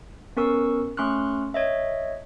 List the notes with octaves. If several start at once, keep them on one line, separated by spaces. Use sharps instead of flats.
B3 C#4 A#4 C#6 E6
A3 C#4 C6 C#6 F6 F#6
C#5 D#5 E5